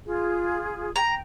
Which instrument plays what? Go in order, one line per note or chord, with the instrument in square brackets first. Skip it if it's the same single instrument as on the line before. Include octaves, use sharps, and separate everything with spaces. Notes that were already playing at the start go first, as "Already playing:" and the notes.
[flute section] F4 G#4
[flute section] G5 [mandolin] A#5